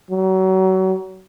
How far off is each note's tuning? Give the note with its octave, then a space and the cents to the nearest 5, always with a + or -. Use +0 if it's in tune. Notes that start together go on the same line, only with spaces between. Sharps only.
F#3 +30